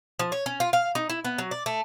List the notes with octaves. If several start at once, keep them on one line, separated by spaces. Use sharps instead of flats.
F3
C#5
C#4
F4
F5
D#4
E4
B3
F#3
D5
A3